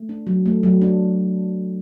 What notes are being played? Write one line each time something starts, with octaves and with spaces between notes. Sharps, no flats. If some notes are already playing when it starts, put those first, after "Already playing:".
Already playing: A3
D4
F#3
A3
F#3
D4